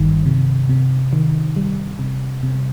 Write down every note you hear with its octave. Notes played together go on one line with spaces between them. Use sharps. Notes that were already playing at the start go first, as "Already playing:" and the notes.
Already playing: G1 G2 D#3 G3
C3
C3
D#3
G3
C3
C3